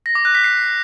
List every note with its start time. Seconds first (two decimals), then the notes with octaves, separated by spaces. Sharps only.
0.06 A#6
0.15 D6
0.25 F#6
0.35 B6
0.44 C7